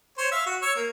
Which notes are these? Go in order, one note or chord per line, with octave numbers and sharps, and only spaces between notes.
C5 C#5
E5 F5
F#4
C#5 C#6 E6
A#3